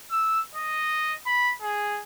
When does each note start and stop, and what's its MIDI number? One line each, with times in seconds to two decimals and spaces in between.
0.11 0.40 88
0.55 1.15 75
1.27 1.54 83
1.62 2.02 68